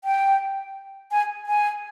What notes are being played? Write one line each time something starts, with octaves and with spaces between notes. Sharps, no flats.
G5
G#5
G#5